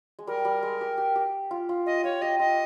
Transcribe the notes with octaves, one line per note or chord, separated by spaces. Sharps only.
G#3
G3 A#4
G3
G#3
G4
G4
G4
F4
F4
F4 D#5
F4 C#5
G4 D#5
F4 D#5